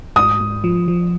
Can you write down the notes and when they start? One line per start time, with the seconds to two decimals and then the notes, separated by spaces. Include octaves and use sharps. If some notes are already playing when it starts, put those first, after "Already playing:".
0.16 G#2 D#6
0.40 G#2
0.64 F3
0.88 F3